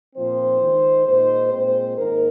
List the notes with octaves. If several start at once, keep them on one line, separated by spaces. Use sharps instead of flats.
A#2 F3 C4 D#4 C5
D#3 G#3 D#4
A#2 G#3 D#4 C5
A#2 G#3 C4 C5
G#2 D#3 A#3 D#4 A#4